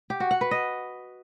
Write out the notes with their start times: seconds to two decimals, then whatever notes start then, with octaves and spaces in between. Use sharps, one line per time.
0.10 G4
0.20 F#4
0.31 F#5
0.41 B4
0.51 D#5